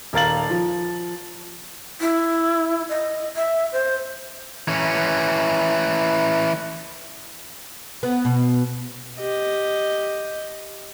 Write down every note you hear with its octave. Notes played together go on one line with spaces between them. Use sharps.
D#1 A#4 F5 A6 F#7
F3
E4
D#5
E5
C5
E3 C#4
B3
B2
G4 D#5